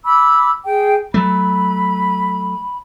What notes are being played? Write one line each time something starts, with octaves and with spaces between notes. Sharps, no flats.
B5 D6 E6
G#4 G5
F#3 A3 B5